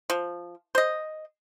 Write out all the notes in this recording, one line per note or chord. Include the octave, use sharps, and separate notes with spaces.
F3
C5 D#5